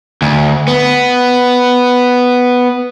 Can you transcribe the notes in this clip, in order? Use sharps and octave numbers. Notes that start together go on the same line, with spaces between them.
D2
B3